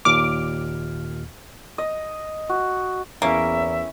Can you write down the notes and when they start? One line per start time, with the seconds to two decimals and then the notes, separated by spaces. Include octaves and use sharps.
0.05 D#2 A#2 D6 F6
1.78 D#5
2.49 F#4
3.22 E2 A#3 C#4 E4 A#4 E5